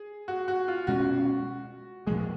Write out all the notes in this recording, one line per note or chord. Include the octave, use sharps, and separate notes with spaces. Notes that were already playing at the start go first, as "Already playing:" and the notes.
Already playing: G#4
F#4
F#4
F4
B2 G#3 C#4 F#4
A#2 F3 G#3 G#4